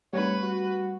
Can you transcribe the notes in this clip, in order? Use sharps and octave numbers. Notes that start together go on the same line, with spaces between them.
G3 A3 C4 D#4 B4 C#5
F#4